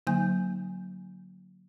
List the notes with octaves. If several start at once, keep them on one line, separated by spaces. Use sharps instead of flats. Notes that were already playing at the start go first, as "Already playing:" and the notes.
D3 F#3 A#3 D#4 G#5 G6